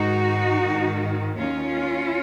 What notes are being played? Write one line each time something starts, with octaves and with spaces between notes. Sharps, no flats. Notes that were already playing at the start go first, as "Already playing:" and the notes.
Already playing: G#2 D#3 D#4 F#4
G#2 D#3
D#2 D#3 C#4 F4